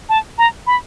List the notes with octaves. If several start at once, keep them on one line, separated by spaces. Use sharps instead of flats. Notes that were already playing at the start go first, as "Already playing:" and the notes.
A5
A#5
B5